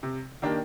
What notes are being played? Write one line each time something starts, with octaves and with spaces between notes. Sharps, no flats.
C3
D#3 A#3 D4 G4